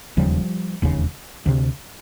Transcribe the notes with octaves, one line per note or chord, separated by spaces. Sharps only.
E1 D#2 C#3 F3 G3
E1 D#2 C#3
D2 C3